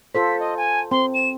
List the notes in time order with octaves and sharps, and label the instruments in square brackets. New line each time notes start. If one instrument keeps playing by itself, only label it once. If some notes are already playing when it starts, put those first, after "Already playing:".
[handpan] F4 A4 C5 [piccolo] B6
[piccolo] D#5
G#5
[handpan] C4 [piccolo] C6
[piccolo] E7